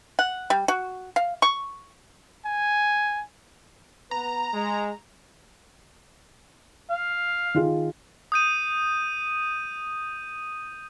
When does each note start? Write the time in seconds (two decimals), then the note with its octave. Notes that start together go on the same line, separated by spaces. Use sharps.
0.19 F#5
0.50 G3
0.68 F#4
1.16 F5
1.42 C#6
2.46 G#5
4.11 B3 B4 A#5
4.54 G#3
6.90 F5
7.55 D#3 F4 G#4
8.32 D#6 G6 D#7